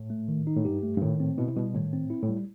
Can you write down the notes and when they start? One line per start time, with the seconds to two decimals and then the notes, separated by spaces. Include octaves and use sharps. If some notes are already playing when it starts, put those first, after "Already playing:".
Already playing: A2
0.10 A3
0.28 D#3
0.47 D#4
0.57 A2
0.65 G2 G4
0.83 A3
0.97 G2
1.02 A2 D#3
1.20 C4
1.38 B2 E4
1.48 C3
1.56 B2 G3
1.74 A2 D#3
1.93 C4
2.10 E4
2.23 A2
2.29 G3